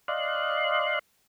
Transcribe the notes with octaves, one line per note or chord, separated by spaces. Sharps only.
D5 D#5 F5 C6 F#6